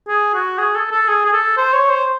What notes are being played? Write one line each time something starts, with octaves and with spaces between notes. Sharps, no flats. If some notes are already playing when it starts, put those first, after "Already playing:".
G#4
F#4
G#4
A4
A4
G#4
G#4
A4
C5
C#5
C5